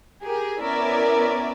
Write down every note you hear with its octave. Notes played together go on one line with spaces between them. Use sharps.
G4 G#4 A#4
B3 C#4 E4 A#4 D5 E5